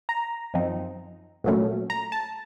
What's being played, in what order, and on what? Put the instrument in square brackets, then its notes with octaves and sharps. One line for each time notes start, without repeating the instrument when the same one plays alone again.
[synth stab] A#5
F#2 F3 C4 D#4
C2 A#2 F#3 A3 C#4
A#5
A5